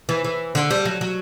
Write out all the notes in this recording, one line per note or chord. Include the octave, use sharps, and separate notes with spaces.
E3
E3
D3
G3
F#3
F#3